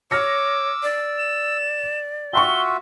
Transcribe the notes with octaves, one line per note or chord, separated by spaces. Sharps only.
C#5 D6 E6 F6 A#6 C#7
D5
E7
F4 F#4 E5 G5 C6 C#6 G7